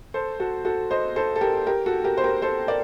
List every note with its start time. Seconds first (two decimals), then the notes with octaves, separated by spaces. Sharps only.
0.14 A4 C5
0.40 F#4 A4
0.65 F#4 A4
0.91 C5 D#5
1.16 A4 C5
1.36 A4
1.41 G4 A#4
1.67 G4 A#4
1.86 F#4 A4
2.04 G4 A#4
2.17 C5
2.24 G4 A#4
2.42 A4 C5
2.68 A#4 D5